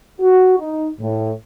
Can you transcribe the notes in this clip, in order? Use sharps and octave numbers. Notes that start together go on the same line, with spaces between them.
F#4
D#4
A2